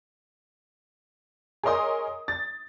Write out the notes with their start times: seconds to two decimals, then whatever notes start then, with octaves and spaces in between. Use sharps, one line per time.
1.63 G#4 A#4 C#5 D#5 C6 D#6
2.28 A6